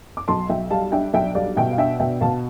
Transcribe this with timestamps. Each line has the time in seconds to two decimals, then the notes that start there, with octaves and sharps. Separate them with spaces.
0.17 D6
0.28 B1 A5 C6
0.49 B1 E5 G5
0.71 G3 F5 A5
0.92 D4 E5 G5
1.13 B1 E5 G5
1.35 G3 D5 F5
1.56 B2 E5 G5
1.71 F5
1.78 D4 E5 G5
2.00 B2 E5 G5
2.20 B2 F5 A5